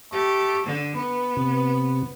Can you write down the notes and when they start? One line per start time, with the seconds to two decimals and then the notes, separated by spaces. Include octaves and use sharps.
0.12 A3 G4
0.66 D3
0.96 B3 B4
1.37 C3